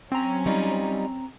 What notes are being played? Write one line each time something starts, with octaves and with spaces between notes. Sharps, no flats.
F#3 C4 C#4 A#5
G3 D#4 F4